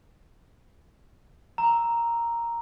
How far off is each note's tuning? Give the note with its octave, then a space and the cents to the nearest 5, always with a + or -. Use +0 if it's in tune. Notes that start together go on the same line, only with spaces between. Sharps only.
A#5 +0 E6 +0